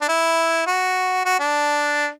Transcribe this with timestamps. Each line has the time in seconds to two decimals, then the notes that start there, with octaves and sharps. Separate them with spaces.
0.02 D4
0.09 E4
0.67 F#4
1.25 F#4
1.40 D4